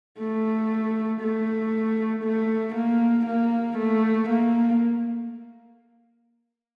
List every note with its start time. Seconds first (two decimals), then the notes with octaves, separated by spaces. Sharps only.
0.19 A3
1.21 A3
2.24 A3
2.75 A#3
3.26 A#3
3.78 A3
4.29 A#3